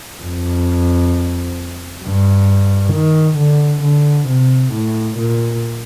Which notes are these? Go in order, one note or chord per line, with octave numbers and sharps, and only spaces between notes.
F2
G2
D#3
D3
D3
C3
A2
A#2